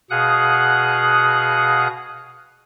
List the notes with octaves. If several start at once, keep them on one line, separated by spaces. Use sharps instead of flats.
B2 G#4 F5 F#5 D#6 F#6